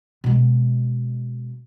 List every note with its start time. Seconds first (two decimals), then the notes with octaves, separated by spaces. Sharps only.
0.24 B2 G#3